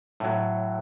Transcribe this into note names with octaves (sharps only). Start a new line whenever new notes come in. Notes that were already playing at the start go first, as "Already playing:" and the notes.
A2 F#3